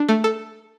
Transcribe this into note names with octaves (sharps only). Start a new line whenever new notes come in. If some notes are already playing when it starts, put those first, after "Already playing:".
Already playing: D4
A3
A4